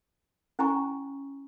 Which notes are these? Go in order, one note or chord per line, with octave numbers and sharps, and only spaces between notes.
C#4 E4 G#5 A#5 C#6